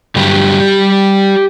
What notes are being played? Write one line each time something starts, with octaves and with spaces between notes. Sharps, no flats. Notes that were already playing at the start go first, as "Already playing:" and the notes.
G2 D3 F#3 G3 G4